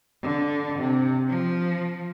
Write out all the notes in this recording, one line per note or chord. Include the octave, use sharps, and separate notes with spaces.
D3
C3
F3